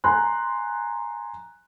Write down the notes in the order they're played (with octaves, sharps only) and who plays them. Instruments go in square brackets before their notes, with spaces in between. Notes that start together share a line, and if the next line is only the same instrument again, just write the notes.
[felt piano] G#5 A#5 C6 F#6